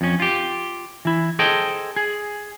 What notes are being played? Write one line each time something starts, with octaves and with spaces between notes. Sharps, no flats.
F2 C#4
F4 G4
E3 E4
G#4 A4 C5 D#5 G5
G#4